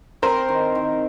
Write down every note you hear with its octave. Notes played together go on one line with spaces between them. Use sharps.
C4 A#4 C5
D#3
D#3